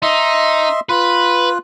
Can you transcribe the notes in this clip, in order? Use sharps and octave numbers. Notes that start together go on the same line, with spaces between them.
D#4 D#5 E5 C6
F4 B4 F#6